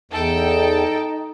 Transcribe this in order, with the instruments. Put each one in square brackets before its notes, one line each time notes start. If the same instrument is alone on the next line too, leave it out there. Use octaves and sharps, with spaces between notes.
[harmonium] E2 [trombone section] D#4 [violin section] A4 G5 A5